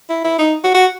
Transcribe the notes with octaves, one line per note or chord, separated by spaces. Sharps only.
E4
E4
D#4
F#4
F#4